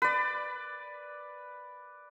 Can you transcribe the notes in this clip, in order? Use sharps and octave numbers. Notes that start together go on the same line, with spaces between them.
B4 D5